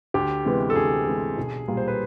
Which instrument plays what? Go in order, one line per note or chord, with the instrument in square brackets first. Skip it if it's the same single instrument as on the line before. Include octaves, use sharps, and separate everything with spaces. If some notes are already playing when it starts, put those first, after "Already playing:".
[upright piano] D2 [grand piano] G4
[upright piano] C3 E3 G#3 B3
[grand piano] A4
[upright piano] D2 [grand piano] G#4
[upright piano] C3 E3 G#3 B3
B1
A#2 G3 A#3
[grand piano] C5
B4